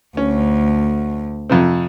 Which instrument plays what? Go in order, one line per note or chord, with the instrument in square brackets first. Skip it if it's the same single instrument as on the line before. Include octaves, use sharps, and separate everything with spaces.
[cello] D2 [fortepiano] C#4
[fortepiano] F2 C3 C4